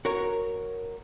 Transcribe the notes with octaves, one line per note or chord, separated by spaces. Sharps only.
F#4 A#4 C#5